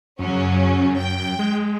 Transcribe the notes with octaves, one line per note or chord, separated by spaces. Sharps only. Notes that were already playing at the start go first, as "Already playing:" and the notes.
F#2 C#3 F#3 C#4
G5
G#3